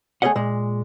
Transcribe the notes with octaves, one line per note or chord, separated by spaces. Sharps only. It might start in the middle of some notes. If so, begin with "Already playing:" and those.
A3 G#4 B4 C#5 D#5 F#5
A#2 G#3